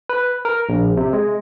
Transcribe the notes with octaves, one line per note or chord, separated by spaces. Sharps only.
B4
A#4
A#1
C3
G#3